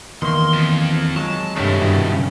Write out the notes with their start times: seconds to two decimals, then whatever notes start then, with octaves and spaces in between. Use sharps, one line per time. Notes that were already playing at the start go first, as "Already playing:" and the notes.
0.22 E2 D#3 A#3 C6
0.53 C4 F4
1.16 F#3 G#3 A5
1.56 G2 C3 D#3 A3 B3 D4 C#5
1.81 G2 B2 E4
2.09 B1 C#3